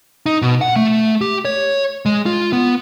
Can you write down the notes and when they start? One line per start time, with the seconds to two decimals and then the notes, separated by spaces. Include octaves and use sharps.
0.26 D#4
0.42 B2
0.61 F#5
0.76 A3
1.21 G4
1.45 C#5
2.06 G#3
2.26 F4
2.53 B3